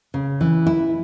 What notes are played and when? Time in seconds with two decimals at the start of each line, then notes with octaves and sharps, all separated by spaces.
0.14 C#3
0.41 E3
0.66 E4